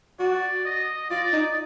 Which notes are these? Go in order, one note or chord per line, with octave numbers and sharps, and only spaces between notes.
F#4 D5
D#5
F4 D5
D#4